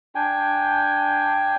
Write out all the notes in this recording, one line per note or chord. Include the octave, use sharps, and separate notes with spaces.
D4 G5 G#5